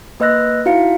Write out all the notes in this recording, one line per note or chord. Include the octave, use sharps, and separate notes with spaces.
A#3 B4 D#5 E6 F#6 A#6
D#4 E4 F#4 F5 C#7